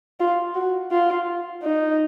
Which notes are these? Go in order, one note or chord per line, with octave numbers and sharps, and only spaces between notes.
F4
F#4
F4
D#4